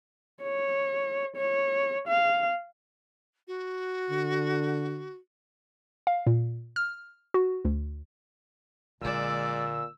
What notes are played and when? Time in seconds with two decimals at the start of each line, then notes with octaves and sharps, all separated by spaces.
0.43 C#5
1.37 C#5
2.08 F5
3.48 F#4
4.10 D3
6.07 F5
6.27 A#2
6.76 F6
7.34 F#4
7.65 D2
9.02 A#1 A#2 D3 G#3 D5 E6